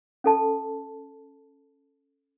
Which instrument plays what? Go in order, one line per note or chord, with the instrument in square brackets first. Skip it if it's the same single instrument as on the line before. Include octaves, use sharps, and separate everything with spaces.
[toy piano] C#4 A4 A5